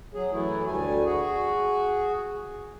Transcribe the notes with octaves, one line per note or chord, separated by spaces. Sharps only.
F#3 G#4
F#2 E3 F#3 A3 E4
D2 G3 A3 G#5
F#4 G#4